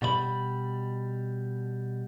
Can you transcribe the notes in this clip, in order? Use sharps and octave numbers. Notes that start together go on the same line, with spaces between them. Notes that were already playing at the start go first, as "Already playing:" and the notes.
B2 G3 C5 B5